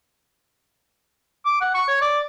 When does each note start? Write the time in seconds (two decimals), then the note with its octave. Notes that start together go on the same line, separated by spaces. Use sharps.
1.45 D6
1.61 F#5
1.74 C#6
1.88 C#5
2.01 D5